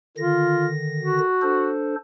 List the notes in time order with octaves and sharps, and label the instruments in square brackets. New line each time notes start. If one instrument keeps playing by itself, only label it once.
[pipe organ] D3 D#3 A#6 [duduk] F4
[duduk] F#4
[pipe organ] D4 A4 C5